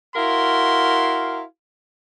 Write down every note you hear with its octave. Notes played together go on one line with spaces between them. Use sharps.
E4 F#4 A#4 F5 C6